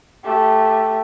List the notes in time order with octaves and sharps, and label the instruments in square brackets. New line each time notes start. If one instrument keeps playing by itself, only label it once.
[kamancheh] A3 G4